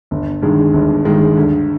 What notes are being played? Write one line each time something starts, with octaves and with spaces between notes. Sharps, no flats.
G1
G2 D#3 G#3
G1
G2 D#3 G#3
D2